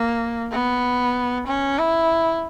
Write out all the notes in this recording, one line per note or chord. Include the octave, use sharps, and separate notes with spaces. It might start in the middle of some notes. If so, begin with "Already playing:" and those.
Already playing: A#3
B3
C#4
E4